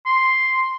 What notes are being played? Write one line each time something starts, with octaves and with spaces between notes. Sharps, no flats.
C6